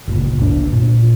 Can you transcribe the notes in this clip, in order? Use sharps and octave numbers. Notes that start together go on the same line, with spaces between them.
G1 C#2 A#2
G1 D4
A#2